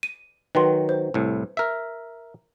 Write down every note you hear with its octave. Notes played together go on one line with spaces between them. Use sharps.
D#7
D#3 F#3 B4 G5 C6
C5
C2 A2
A#4 E5